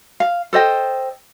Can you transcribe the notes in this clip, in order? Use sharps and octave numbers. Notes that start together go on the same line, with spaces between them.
F5
A4 C5 D#5 G5